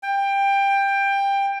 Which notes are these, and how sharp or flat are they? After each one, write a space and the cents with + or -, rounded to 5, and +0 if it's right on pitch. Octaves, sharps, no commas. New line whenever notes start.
G5 +20